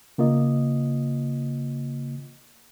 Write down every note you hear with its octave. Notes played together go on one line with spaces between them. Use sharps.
C#3 A#3 F4 D#5